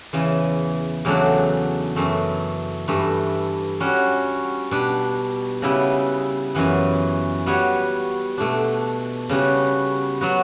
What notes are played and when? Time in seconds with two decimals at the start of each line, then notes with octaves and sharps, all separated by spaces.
0.13 E2 C#3 E3
1.05 E2 C#3 F#3 A3 D4
1.96 F#2 E3 A3
2.88 G2 E3 A3
3.80 G3 C#4 F#4
4.71 B2 G3 D4
5.62 C#3 G3 B3 E4
6.55 F#2 C#3 E3 B3
7.46 G3 B3 F#4 C#5
8.38 B2 A3 D4
9.29 C#3 G3 B3 F#4
10.21 F#3 B3 F#4